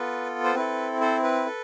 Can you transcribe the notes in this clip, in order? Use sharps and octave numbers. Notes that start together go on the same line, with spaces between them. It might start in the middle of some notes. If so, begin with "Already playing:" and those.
Already playing: B3 F4 A4 B4
C5
C4 E4 A4 B4
A4 C5
B4
A4